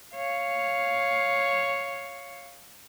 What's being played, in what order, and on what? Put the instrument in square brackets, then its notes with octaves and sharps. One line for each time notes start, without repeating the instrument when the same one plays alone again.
[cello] C#5 F5